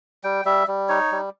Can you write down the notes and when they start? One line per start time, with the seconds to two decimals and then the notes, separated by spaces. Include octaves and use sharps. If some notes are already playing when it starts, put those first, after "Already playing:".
0.24 G3 G5
0.45 G3 E5
0.68 G3
0.89 D#4 C#5
1.12 G3